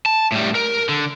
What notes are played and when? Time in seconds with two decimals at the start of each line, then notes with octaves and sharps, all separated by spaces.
0.06 A5
0.32 A2 G3
0.55 A#4
0.89 D3